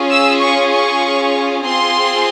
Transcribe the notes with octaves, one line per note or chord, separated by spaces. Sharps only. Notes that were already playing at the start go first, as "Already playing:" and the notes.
Already playing: C#4 F4 G#4
E6
C#6
C#6
C4 F4 G#4 C6